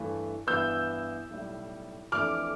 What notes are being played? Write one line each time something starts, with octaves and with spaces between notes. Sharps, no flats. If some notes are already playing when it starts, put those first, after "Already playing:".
Already playing: G2 E3 A3
G2 E3 B3 E6 G6
B1 A2 G3
F2 E3 A3 D4 D6 F6